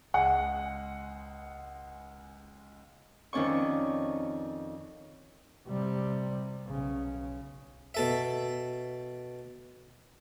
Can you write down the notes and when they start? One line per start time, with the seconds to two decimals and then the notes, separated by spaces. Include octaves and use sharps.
0.14 C#2 G#3 F#5
3.33 F2 D#3 C#4 D5 C#6
5.68 C3 G3
6.66 B1 C#3
7.94 B2 A4 E5